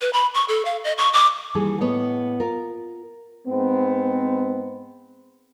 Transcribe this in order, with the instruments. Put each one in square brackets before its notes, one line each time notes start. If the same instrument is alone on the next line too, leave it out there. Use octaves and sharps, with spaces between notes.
[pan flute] B4
B5
C#6
A4
F5
D#5
C#6
D6
[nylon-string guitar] D#2 E3 G3 G#4 A4
A2 B3 C#5 D#5
F4 A#4
[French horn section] G#2 B3 C4